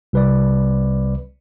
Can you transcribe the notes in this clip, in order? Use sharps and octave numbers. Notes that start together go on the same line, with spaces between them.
C2 B4 D5